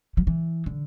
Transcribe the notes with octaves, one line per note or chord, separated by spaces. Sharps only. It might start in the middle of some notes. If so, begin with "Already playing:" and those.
F3
E3
D3